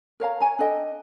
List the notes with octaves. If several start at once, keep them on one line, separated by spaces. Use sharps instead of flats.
A#4 C#5 F5 A#5
C#5 G#5 A#5
D4 A4 D#5 G5